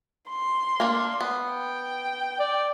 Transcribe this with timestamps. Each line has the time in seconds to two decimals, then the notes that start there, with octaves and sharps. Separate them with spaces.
0.30 C6
0.80 A#3 D4
1.21 B3
1.54 G5
2.39 D5